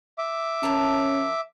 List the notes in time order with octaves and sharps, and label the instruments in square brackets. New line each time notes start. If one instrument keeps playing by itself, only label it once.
[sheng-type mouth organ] E5 D6
[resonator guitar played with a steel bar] F2 A#4 A5 [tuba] C#4